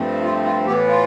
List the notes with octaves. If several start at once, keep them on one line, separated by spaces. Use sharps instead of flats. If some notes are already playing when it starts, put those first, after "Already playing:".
Already playing: G2 F3 A3 C4
F4
F4
A2 E3 B3 G4
F4